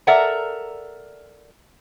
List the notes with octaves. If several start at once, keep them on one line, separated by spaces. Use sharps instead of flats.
A4 A#4 D5 E5 F#5 A#5